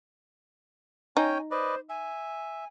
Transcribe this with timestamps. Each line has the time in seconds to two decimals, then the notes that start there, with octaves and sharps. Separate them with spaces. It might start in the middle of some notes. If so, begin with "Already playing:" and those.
1.17 C#4 D#4 C#5 G5 G#5
1.51 B4 C5 D5 D#5
1.89 E5 G#5